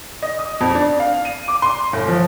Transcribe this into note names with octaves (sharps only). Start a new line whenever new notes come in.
D#5
D#6
F2
D4
F5
D#7
D6
C6
G1
F3